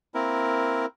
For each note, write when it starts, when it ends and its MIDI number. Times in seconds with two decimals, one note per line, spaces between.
0.15 0.86 58
0.15 0.86 60
0.15 0.86 64
0.15 0.86 70